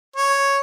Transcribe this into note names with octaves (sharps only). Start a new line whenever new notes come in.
C#5